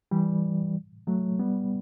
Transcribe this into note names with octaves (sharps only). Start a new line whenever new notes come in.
E3 G3
F#3 A3
G3 B3